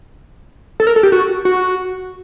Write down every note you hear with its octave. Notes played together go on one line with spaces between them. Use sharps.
A4
A#4
A4
G4
F#4
F#4